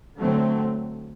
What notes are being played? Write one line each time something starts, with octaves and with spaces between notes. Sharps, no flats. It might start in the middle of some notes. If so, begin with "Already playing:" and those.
D3 F#3 A3 C4